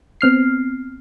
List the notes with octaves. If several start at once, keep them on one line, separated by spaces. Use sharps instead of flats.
B3 C4 F6 C7